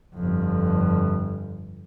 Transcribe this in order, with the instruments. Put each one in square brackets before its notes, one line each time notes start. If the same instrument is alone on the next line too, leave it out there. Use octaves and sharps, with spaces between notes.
[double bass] G1 F2